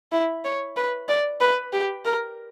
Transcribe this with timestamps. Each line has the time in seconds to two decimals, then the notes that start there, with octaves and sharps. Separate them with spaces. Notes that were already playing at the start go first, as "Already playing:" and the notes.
0.12 E4
0.45 C#5
0.76 B4
1.09 D5
1.41 B4
1.73 G4
2.05 A#4